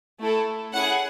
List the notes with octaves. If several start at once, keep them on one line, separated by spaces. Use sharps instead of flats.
A3 E4 A4
C#4 E4 G#4 F#5